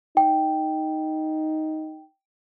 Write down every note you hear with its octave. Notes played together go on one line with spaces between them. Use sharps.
D#4 G5